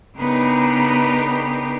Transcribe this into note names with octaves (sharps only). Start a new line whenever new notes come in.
C#3 B3 D4 D#4 G4 A#4